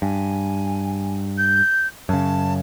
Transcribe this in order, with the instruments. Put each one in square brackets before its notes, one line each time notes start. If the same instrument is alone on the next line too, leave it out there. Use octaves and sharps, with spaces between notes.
[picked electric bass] G2 [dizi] G#5
[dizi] G6
[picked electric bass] F#2 C#3 [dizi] A5